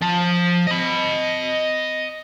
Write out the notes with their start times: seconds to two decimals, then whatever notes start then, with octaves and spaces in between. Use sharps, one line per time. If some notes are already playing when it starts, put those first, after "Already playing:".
0.01 F3 A5
0.67 D#5 B5